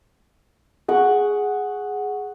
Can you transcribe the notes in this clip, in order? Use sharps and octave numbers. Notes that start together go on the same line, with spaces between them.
G#4 F#5 C#6